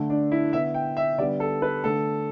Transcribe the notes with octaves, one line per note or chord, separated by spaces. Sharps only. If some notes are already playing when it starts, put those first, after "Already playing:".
Already playing: D3 A3
D4
E4
D3 B3 E5
G5
E5
D3 G3 B3 D5
A4
B4
D3 A3 A4